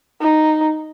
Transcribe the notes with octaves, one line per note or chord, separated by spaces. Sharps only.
D#4